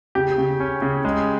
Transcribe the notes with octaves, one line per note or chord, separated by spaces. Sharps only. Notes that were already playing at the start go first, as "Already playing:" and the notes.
C#3 G4
C#3
C#4
C#3
G#3